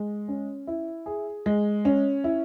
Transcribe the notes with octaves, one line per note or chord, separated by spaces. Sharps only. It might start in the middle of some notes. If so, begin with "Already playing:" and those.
Already playing: G#3
C#4
E4
G#4
G#3
C#4
E4